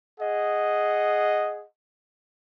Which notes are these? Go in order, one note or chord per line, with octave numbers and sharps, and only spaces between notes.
G#4 D#5 F#5